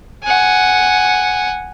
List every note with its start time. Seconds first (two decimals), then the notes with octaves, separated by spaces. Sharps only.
0.24 F#5 G#5